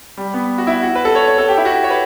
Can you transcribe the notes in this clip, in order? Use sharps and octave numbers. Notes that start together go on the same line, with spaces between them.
G3
B3
F#4
E4
F#4
B4
A4
C#5
C#5
A4
G4
E4
F#4
G4
C#5
B4